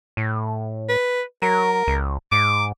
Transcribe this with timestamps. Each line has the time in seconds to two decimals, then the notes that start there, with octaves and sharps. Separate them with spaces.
0.17 A2
0.89 B4
1.42 F#3 A#4
1.87 C#2
2.32 G#2 D6